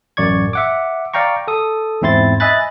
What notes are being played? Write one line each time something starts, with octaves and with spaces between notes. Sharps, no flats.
A1 F#2 D5 C#6 G#6
E5 F#5 D6
D5 F5 G5 A#5 C#6
A4 D#6
E2 G#2 C4 E4 C6 A6
D#5 E5 G#5 B5 F#6 A6